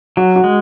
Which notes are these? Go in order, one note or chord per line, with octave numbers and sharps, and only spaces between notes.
F#3 F#4
F#4
G#3